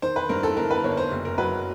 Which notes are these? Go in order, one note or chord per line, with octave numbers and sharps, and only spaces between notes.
D#3 C5
B4
G2 A#4
A4
G1 A#4
B4
G1 C#5
C5
F#1
A#4
F#3 B4